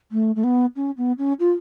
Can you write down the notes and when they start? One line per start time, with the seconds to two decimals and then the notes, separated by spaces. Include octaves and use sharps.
0.12 A3
0.36 A3
0.44 B3
0.76 C#4
0.97 B3
1.18 C#4
1.40 F4